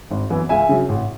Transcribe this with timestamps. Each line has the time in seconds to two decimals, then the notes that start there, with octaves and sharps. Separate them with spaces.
0.11 G#1
0.30 F#2 E3 B3
0.49 C#2 E5 G#5
0.69 C#3 F#3
0.89 A1